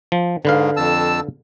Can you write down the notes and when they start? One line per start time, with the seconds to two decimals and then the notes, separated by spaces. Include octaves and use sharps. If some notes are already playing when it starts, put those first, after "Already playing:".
0.12 F3
0.45 G#2 D3 B4 F5
0.77 F2 A5 E6